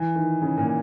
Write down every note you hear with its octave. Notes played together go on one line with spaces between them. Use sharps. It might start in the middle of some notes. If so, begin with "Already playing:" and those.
Already playing: E3
D#3
C#3
A#2